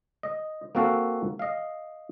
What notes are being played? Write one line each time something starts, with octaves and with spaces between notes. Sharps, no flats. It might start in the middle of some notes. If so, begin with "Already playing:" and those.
D#5
A#3 C4 F#4 A4 F5
D#5 F5